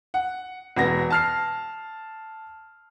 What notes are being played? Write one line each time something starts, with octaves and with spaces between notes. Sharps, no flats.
F#5
E1 B3 A#6
A5 F6 C7